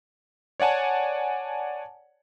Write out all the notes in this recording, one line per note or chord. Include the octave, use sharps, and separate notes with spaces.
C#5 D5 F#5 G#5 A5